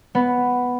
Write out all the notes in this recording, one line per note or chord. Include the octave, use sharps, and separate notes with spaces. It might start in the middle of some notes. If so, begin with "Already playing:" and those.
B3